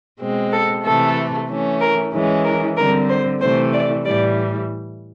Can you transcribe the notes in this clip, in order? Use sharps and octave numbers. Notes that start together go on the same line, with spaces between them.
B2 G#3 C4
A4
C3 E3 A3 A4
E3 A3 C#4
A#4
E3 G#3 C#4
A#4
D3 G3 C4 A#4
C5
C3 E3 A3 C5
D5
A2 E3 G3 D5